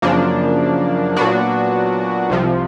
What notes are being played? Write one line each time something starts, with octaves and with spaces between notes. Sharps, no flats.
F#2 C#3 F3 A#3 D4
A#2 F#3 B3 D4 F#4
C2 C3 F3